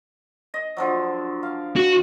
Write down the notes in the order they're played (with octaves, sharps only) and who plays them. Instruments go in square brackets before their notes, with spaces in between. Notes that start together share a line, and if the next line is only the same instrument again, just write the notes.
[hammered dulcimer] D#5
D3 F3 F#3
F5
[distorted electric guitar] F#4